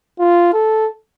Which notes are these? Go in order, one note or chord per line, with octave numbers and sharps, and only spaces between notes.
F4
A4